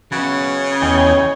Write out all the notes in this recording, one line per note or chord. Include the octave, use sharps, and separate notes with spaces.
C#3 C#4 F#4 B4
E2 C#5 D#5 G5 G#5